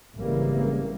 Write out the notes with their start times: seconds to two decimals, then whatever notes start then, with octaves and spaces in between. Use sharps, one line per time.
0.15 G#1 C#3 E3 G3 A#3